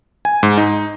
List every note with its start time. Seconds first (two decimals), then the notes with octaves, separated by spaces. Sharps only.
0.25 G#5
0.43 G#2
0.58 D#4